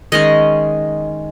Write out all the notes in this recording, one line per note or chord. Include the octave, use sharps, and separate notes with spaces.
D#3 G#3 C#4 D#5